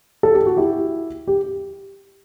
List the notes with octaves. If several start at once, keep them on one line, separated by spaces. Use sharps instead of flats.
A4
G4
F#4
E4 G4
G4